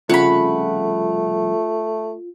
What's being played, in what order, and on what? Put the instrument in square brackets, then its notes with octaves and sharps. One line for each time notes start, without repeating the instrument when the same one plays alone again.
[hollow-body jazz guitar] C2 F2 C#3 [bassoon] A3 [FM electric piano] F4 [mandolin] F#5 B5